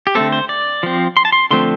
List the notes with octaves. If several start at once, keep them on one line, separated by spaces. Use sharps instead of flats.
G4
D3 A3 C4 A4
C5
D5
F3 C4
C6
A5
C6
D3 F3 A3 C4 C6